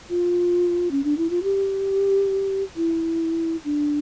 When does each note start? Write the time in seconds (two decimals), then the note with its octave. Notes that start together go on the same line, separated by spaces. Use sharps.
0.10 F4
0.91 C#4
1.04 D4
1.18 E4
1.30 F4
1.43 G4
2.76 E4
3.65 D4